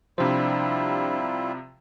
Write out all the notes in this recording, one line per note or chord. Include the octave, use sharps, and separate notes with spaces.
C3 F3 G3 D4 E4 F4 C5